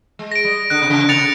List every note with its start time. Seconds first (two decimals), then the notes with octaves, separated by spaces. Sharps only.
0.19 G#3
0.32 A#6 D7
0.44 G3
0.70 D3 F#6
0.82 C3
0.90 C#3
1.09 C3 A6 C#7 F7